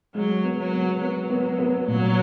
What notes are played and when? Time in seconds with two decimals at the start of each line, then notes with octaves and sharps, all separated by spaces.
0.15 F#3 G#3
0.44 B3
0.58 F#3
0.72 B3
1.01 F#3 B3
1.30 B3
1.59 B3
1.87 A#2 F#3